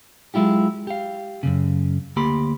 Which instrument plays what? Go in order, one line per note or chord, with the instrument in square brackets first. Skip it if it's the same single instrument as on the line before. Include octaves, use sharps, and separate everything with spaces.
[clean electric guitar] F#3 G#3 E4 F4 G4
G4 F5
F#2 A2 C#3
D2 A#3 G4 B5 C6